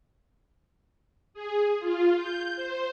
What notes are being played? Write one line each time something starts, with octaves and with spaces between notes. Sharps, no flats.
G#4
F4
G6
C5